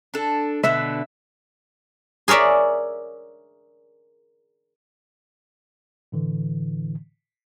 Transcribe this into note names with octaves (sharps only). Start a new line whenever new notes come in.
D4 A4
B2 D3 B3 E5
G#4 A#4 C#5 D5 E5
A2 D3 E3